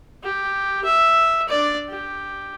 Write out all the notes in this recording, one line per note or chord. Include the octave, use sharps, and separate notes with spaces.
G4
E5
D4 D5
G4